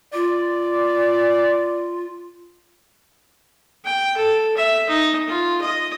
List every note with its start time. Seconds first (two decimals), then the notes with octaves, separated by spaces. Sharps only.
0.14 F4 D5
3.85 G5
4.17 A4
4.57 E5
4.89 D#4
5.28 F4
5.62 D#5